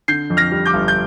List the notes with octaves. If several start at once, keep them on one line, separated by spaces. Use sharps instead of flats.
D3 G6 C7
F2
F6 A#6
G3
D6 G6
G1
G6